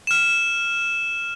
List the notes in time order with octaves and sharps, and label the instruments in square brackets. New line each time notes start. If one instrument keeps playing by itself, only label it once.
[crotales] F6 E7